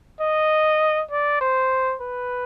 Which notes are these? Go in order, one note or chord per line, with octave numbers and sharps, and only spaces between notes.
D#5
D5
C5
B4